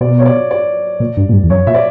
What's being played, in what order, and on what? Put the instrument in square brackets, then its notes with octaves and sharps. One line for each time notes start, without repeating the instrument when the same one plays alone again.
[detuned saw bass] B2 [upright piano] D5
[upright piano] C#5
D5
D5
[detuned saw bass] A#2
G2
A#2
G2
E2
[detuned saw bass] F#2 [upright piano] C#5
[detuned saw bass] A#2 [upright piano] E5
[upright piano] D5